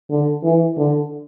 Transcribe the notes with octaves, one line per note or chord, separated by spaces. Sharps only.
D3
E3
D3